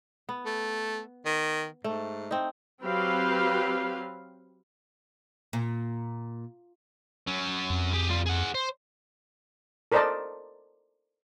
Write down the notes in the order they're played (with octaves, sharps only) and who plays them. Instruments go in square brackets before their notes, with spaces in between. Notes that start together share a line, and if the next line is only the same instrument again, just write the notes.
[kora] B3
[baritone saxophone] A3
D#3
[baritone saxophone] G#2 [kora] A3
[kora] C4 D#4
[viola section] F#3 C4 G4 B4 F5
[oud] A#2
[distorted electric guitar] F#3 C#4
[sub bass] F2
[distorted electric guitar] G4 G#4
G3 F4
G#4 F#5
C5
[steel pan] A4 A#4 C5 D5 D#5 A5